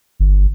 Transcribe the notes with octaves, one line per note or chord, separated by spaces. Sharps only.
G1